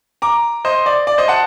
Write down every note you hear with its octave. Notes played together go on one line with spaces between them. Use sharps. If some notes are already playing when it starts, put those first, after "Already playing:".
A#5 D6
C5 D#5
D5
D5
C5 D#5
F#5 A5